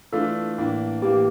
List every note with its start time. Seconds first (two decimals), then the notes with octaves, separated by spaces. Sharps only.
0.12 E3 A3 D4 F4 A4
0.58 A2 E3 A#3 D4
1.02 A2 E3 A#3 G4